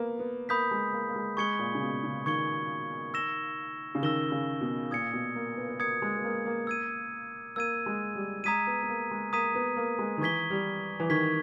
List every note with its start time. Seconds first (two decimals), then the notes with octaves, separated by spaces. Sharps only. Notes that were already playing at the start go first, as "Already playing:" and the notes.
Already playing: A#3 B3
0.19 B3
0.49 A#3 B5 D#6 G6 B6
0.71 G#3
0.93 A#3
1.09 A#3
1.16 G#3
1.37 G#3 C#6 G#6 C#7 G7
1.59 A#2
1.75 C#3
1.82 B2
2.04 C#3
2.26 D#3 C#6 G#6 C#7 G7
3.14 E6 A#6 E7 G7
3.95 C#3
4.02 D#3 E6 A#6 E7 G7
4.32 C#3
4.61 B2
4.91 A#2 D#6 G#6 C#7
5.13 B2
5.35 A#3
5.57 B3
5.69 B3
5.80 A#3 D#6 G#6 C#7
6.02 G#3
6.18 B3
6.24 A#3
6.46 A#3
6.67 E6 G#6 D#7
7.56 A#3 E6 G#6 D#7
7.86 G#3
8.15 G3
8.44 G#3 A#5 D#6 G#6 B6 D#7
8.67 B3
8.83 B3
8.89 A#3
9.11 G#3
9.33 A#3 A#5 D#6 G#6 B6 D#7
9.55 B3
9.76 A#3
9.99 G#3
10.17 D#3
10.21 E3 C#6 G#6 B6 G7
10.50 G3
11.00 E3
11.09 D#3 C#6 G#6 B6 G7